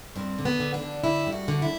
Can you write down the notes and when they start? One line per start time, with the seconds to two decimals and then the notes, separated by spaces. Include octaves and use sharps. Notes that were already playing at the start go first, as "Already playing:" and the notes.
0.16 G2 C4
0.38 D3
0.45 B3
0.60 D3
0.74 D4
0.82 D3
1.04 D3 E4
1.26 G2
1.33 F#4
1.48 D3
1.62 E4